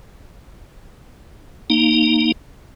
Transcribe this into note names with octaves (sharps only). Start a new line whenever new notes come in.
A#3 D#4